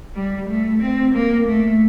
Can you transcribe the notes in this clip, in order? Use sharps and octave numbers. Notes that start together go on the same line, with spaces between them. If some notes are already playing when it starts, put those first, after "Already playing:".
G3
A3
C4
A#3
A3